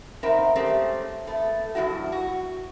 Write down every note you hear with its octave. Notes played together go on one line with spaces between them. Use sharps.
B3 C4 D#4 A#4 E5
G#3 A3 C4 C#4 G4
A3 B3 A4
E2 G2 B2 E4 F#4
F#4